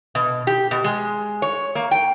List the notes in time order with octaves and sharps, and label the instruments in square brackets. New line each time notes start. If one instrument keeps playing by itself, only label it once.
[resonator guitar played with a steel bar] B2
G4
B2
G#3
C#5
A#3
G5